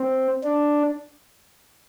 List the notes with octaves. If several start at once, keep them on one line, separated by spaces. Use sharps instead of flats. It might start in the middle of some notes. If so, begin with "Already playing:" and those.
Already playing: C4
D4